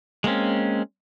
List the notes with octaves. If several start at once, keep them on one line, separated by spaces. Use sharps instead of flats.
G#3 A#3 C4 C#4